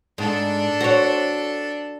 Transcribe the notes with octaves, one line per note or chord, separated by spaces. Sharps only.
G#2 D4 A4
F#4 C5 C#5